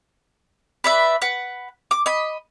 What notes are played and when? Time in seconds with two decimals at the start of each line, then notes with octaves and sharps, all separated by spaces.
0.84 B4 D5 E5
1.22 B4 F#5
1.91 D6
2.06 D#5 B5